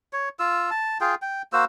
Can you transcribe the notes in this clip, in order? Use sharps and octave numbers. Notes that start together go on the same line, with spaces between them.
C#5
F4 E6
A5
F4 G#4 G5
G5
A#3 F#4 C5 E6